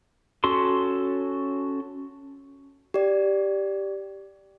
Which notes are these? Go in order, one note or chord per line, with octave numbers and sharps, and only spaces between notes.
C#4 F#4 A4 C6
G4 D5